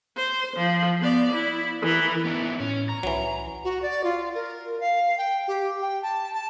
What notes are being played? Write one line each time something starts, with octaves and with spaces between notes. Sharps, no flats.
C5
F3
B3 D5
E4
E3 A#4
B3 D#4 E4
A2 C#4
A#5
C2 E3 F#3
F#4
D5
F4
A#4
F5
G5
G4
G5
A5
A5